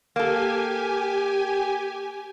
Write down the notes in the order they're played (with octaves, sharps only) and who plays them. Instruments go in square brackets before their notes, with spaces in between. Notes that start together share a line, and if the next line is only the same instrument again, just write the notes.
[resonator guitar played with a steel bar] A#3 A4 [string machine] G4 G#5